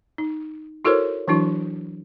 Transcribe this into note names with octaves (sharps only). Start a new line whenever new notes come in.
D#4
E4 F#4 A4 A#4 C5 C#5
E3 F#3 D4 E4 F#4